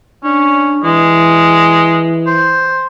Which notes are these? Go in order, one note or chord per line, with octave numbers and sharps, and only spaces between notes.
C#4 D4
E3 G#3
C5